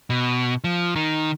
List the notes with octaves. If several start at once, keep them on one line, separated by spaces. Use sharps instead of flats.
B2
F3
D#3